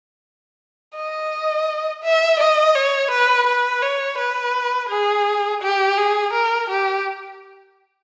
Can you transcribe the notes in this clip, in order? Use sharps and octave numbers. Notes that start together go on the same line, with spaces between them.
D#5
E5
D#5
C#5
B4
B4
C#5
B4
G#4
G4
G#4
A#4
G4